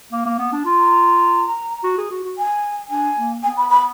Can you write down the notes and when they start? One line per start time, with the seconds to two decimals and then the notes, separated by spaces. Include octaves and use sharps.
0.12 A#3
0.26 A#3
0.39 B3
0.52 D4
0.65 F4
0.79 A#5
1.84 F#4
1.98 G#4
2.11 F#4
2.24 F#4
2.38 G#5
2.91 D4 G#5
3.17 A#3
3.43 B3 G#5
3.57 B5
3.69 B5